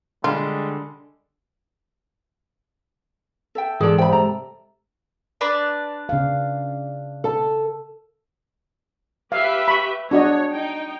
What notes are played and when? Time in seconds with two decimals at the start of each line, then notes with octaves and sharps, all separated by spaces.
0.24 D3 G3 G#3 F4
3.55 A4 E5 G5
3.81 G#2 E3 G#4 A4 D5
3.98 C3 G5 B5
4.12 G#3 A4 A#5
5.41 D4 B4 D5
6.09 C#3 F5
7.24 A4 A5
9.32 G4 B4 E5 F5
9.68 B5 C#6
10.11 D4 F#4 C#5 D#5
10.51 D#4 G5